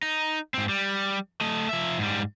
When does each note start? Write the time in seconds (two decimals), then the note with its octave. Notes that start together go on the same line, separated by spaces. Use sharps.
0.03 D#4
0.54 G#2 C4
0.69 G3
1.41 A3 D#5
1.69 F3 E5
1.98 G#2 G3